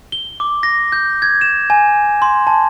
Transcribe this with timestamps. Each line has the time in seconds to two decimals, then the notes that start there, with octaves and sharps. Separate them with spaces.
0.12 G7
0.40 D6
0.63 A#6
0.92 G6
1.22 G#6
1.41 E7
1.70 G#5
2.22 C6
2.47 A5